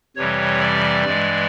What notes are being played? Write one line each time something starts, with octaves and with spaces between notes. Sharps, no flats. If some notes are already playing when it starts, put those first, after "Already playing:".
F2 C3 E3 G3 C#5
D5
G2 E3 G#3